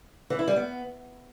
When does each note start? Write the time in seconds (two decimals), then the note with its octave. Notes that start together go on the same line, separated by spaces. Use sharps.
0.30 E3
0.39 E4
0.47 G3
0.56 B3